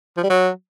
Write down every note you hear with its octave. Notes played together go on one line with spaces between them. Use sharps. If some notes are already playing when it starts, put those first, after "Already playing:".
F3
G3
F#3